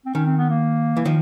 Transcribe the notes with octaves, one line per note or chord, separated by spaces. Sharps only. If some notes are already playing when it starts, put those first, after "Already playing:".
C4
D#3 C#4
C4
B3
A#3
E3
D#3 F3